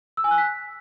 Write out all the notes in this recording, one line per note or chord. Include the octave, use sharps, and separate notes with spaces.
E6
G#5
F#6
B6